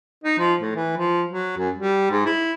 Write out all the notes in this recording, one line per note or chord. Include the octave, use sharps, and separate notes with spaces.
D#4
F3
A2
E3
F3
F#3
F#2
G3
G#2
E4